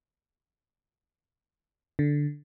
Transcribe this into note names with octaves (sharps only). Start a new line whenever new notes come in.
D3